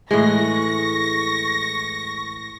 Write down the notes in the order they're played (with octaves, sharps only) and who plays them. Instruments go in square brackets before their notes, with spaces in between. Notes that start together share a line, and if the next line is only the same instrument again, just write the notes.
[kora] A2 E3 G#3 [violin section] C#6 A#6